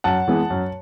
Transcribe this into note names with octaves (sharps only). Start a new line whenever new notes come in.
F#2 F#5 A5
E3 G#3 B3
F#2